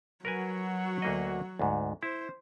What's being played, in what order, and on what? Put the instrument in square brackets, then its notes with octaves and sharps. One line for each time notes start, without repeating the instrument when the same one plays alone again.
[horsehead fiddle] F#3 F#4 [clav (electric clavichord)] A#4 B4 G#5
[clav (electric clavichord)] D2 A#3 D#5
D2 G#2
[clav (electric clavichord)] E4 [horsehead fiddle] C5